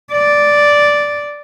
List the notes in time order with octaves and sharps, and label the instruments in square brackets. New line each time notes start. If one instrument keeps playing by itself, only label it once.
[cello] D5